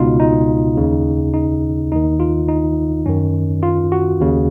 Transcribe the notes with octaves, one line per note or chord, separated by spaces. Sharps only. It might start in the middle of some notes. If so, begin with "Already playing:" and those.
Already playing: C#2 B2 D#4 F4
D#4
D#2 C#3
D#4
D#2 D#3 D#4
F4
D#4
F#2 D#3 C#4
F4
F#4
D#2 C#3